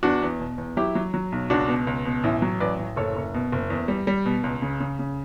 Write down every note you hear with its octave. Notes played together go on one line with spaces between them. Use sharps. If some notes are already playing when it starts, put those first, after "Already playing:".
E2 D4 F#4
E2
B2
E2
F#3 E4 G4
F#3
F#3
B1
C#2 D4 F#4
B2
C#2
B2
A1 E4
F#3
A1 B4 D5
A1
F#1 A4 C#5
F#1
B2
F#1
E2
G3
G3
B2
C#2
C#3
C#3
C#3